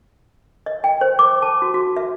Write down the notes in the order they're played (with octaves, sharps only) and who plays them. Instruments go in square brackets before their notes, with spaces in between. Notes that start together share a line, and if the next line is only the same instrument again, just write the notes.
[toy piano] D#5
G5
C5
D6
A5
F#4
F#4
E5